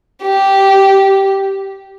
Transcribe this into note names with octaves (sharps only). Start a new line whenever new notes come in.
G4